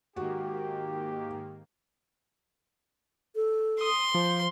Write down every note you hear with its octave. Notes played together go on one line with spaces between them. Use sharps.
G#2 D#3 A#3 F#4 G4
A4
C6 D#6
F3 C5